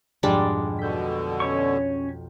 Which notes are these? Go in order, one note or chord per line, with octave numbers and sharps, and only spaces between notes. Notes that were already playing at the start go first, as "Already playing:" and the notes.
B1 F2 G#2 G3 G#3 D4
B2 D3 G6 B6
C#4 C#5 C#6